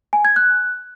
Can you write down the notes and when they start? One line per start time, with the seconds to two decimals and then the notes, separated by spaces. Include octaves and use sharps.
0.13 G#5
0.25 G#6
0.36 F#6